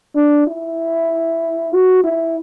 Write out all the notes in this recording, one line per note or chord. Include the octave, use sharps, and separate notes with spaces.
D4
E4
F#4
E4